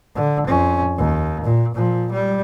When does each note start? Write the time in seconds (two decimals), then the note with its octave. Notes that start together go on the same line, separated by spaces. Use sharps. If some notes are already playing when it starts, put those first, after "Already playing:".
0.15 D3
0.47 F2 C#4
0.98 D#2
1.44 A#2
1.74 A#2 F3
2.12 G3